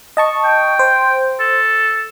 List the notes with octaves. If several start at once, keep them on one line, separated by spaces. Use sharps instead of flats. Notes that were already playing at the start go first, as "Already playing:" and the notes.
D#5 A5 C#6
G5
C5
A4